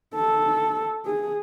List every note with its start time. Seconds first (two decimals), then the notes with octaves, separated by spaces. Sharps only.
0.15 A4
1.06 G#4